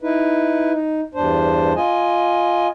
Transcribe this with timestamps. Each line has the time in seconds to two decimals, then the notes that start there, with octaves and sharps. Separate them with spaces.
0.01 D#4 E4 B4
0.73 D#4
1.15 E2 G2 D4 C5
1.76 F4 D#5 G#5